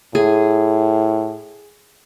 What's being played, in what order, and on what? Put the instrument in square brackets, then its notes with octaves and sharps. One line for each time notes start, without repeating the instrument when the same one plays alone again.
[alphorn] A2 [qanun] G#4